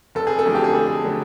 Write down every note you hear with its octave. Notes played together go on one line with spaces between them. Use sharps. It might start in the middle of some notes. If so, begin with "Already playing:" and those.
F1 A4
G#4
A4
F2 D3 F#3 A3
G4
G#4
F1 A4
D3 F#3 A3